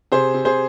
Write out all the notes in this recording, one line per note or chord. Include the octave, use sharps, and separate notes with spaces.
C3 G#4 C5
C3
G#4 C5